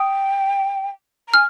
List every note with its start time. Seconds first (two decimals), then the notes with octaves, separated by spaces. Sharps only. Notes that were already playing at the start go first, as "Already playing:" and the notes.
Already playing: G5 D#6
1.28 A#5
1.34 G#5 F6